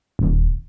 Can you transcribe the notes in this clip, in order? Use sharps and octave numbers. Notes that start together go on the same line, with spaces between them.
D#1